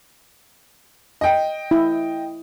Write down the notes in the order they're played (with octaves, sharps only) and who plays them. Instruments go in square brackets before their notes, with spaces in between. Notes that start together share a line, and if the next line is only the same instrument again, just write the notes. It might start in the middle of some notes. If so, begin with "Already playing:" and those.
[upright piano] D#5 G5
[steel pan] E4